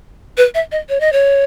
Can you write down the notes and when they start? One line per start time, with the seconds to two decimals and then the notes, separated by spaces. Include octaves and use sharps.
0.37 B4
0.55 E5
0.72 D#5
0.89 C#5
1.00 D#5
1.12 C#5